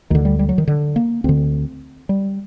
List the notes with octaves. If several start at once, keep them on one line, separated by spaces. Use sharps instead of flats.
D2 D3 D#3
G3
G3
F#3
D#3
D3
A#3
D2 D3 C4
G3